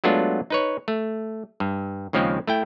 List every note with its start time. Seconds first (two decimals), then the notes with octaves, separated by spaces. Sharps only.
0.04 F#3 G#3 A3 B3 D4 F4
0.50 D#4 B4 C#5
0.88 A3
1.60 G2
2.13 D#2 C#3 F3 G#3 C4
2.47 A3 E4 G5